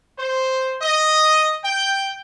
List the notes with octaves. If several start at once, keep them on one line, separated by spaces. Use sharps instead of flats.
C5
D#5
G5